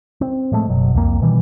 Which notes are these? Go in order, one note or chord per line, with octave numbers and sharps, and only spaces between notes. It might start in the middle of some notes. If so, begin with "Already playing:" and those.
C4
A2 F3 G#3 A3
F#1 B2 F#3
C2 F2 A#3
B2 D#3 E3 G3